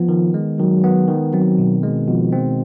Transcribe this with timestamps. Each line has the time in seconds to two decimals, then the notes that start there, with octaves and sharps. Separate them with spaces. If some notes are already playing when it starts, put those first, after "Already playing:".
Already playing: F3 B3
0.09 D#3
0.34 G#3
0.59 D#3 F#3
0.84 B3
1.08 D#3
1.33 F#3 C4
1.58 B2
1.83 G#3
2.08 B2 F3
2.33 C4